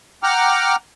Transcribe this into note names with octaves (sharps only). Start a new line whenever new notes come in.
F#5 G5 A#5 D6 F6